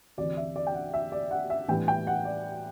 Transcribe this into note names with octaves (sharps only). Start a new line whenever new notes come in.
D2 C3 E3 D5
E5
D5
G5
F#5
E5
D5
F#5
E5
A2 E3 G3 B3 D4 G5
G5
F#5
D5